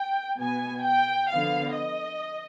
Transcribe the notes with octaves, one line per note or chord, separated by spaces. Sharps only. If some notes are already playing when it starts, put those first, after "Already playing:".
Already playing: G5
B2 B3 G#5
G5
D3 F3 B3 F5
D#5